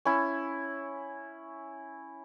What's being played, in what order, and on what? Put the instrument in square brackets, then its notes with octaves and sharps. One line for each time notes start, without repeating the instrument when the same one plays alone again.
[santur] C#4 E4